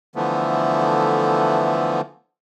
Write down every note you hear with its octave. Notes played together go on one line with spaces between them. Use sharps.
D3 E3 F3 A3 B3